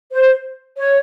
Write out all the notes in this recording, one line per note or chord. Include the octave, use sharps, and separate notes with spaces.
C5
C#5